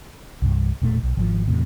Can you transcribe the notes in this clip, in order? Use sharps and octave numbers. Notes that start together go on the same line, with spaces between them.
C2 G2
E1 A#2 A3
B1
G#1 D#3 F3
E2 A2 C3